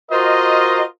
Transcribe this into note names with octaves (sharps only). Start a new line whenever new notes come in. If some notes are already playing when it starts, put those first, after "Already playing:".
F4 F#4 A#4 C5 D#5